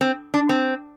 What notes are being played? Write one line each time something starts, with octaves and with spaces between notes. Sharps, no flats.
C4
D4
C4